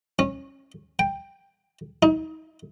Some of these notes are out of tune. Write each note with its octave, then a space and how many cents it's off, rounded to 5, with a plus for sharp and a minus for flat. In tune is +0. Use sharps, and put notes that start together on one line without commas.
C#4 -25
G5 +10
D#4 +35